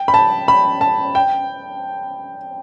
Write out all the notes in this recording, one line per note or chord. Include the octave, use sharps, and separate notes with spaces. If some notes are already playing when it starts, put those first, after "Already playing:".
Already playing: G5
B5
A5
B5
A5
G5